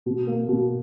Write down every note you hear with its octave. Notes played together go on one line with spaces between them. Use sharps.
B2
A#3
B2